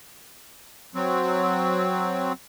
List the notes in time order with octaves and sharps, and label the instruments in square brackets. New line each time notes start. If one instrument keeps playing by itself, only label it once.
[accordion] F#3 C4